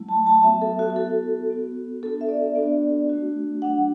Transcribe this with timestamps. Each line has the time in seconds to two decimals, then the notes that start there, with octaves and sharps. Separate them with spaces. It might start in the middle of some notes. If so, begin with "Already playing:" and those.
Already playing: F#3 A3 E4
0.09 A5
0.27 A5
0.43 F#3 B3 F#4 E5
0.62 A4
0.79 F#4
0.90 F#4
0.96 B3 E4 A4
1.50 B3 F#4
2.02 B3 D4 F#4 A4
2.21 E5
2.29 D5
2.55 B3 D4 F#4
3.10 A3 D4 F#4
3.62 F#3 D4 F#4 F#5